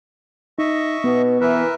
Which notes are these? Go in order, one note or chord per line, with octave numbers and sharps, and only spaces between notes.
D#4 D#5 E5 C#6
B2 B3
E3 A#4 B4 E5